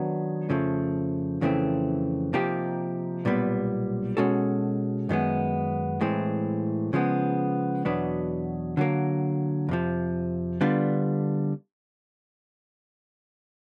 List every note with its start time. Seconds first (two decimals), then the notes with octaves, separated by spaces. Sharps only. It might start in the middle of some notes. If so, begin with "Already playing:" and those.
Already playing: D#3 F#3 B3 D4
0.49 F2 C#3 F3 A3
1.41 F2 C#3 E3 A3 C4
2.33 C3 F3 A#3 D#4 G4
3.25 B1 A#2 G3 B3
4.17 B2 G#3 C#4 F#4 A4
5.09 F#2 D#3 G#3 B3
6.01 A2 E3 G#3 C4
6.93 C#3 F3 G#3 B3
7.85 E2 B2 F#3 B3 D4
8.77 D3 F#3 A#3
9.69 F2 C3 F3
10.61 D3 G3 B3 D4 F4